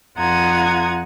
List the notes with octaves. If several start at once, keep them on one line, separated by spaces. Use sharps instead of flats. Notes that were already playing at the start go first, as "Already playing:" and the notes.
F2 F4 F#5 A#5 D#6 G#6